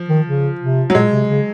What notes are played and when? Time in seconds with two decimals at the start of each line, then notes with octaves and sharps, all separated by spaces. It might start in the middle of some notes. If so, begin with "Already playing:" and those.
Already playing: F3
0.09 D#3
0.26 C#3
0.60 C3
0.90 F#3
0.95 A#2 G#3
1.12 C3
1.29 C#3